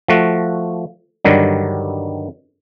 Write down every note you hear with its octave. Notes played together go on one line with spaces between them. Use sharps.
F3 A3 F#4
G2 D3 D#3 F#3 G3